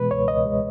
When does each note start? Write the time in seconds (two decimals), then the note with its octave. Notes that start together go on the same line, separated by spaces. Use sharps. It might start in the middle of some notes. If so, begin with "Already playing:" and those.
Already playing: B2 E3 G#3 B4
0.11 C#2 C#5
0.28 C#2 D#5
0.45 G#3